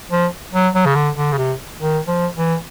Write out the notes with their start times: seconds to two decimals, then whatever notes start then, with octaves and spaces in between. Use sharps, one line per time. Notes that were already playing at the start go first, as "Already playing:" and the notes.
0.12 F3
0.54 F#3
0.75 F#3
0.86 C#3
0.95 D3
1.16 D3
1.32 C#3
1.38 C3
1.80 D#3
2.08 F3
2.36 E3